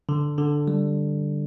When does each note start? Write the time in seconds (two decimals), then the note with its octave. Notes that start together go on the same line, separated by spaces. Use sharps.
0.09 D3
0.38 D3
0.68 G3